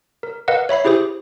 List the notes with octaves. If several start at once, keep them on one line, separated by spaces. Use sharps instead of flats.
A#4
A#4 B4 D#5 F5 F#5
C#5 E5 B5 C7
E4 G4 G#4 C5 D#6